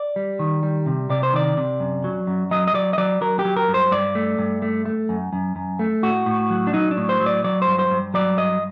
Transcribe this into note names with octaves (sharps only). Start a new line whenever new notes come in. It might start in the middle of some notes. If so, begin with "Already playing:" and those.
Already playing: D5
G3
D#3
G3
C3
C3 D5
C5
D#3 D5
C3
F#2
F#3
F#2
F#3 D#5
D#5
F#3 D5
D#5
F#3 D5
F#3 A#4
G4
F#3
A#4
G2
C5
G2 D5
A3
G2
A3
A3
F#2
F#2
F#2
A3
A2 F#4
A2
F#3
D4
F#3 D#4
D4
A2
C5
F#3
D5
F#3 D5
C5
G2
C5
G2
F#3 D5
G2 D#5